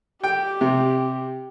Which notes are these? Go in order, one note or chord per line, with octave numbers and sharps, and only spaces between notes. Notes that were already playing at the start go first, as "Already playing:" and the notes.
G4 G5
C3